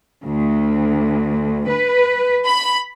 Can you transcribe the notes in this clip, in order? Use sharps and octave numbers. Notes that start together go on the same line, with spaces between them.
D2
B4
B5